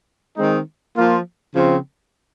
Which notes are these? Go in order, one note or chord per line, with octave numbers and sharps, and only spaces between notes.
D#3 G#3 C4 D#4
F3 A#3 F4
C#3 F3 C4